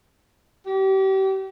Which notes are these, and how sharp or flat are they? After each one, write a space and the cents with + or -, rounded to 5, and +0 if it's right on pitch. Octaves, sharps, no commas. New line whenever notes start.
G4 -35